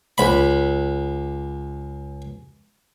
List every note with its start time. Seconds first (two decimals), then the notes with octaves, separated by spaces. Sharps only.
0.18 C#2 B5